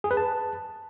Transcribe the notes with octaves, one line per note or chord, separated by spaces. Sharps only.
G#4
B4
A5